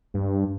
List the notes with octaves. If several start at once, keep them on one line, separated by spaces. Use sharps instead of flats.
G2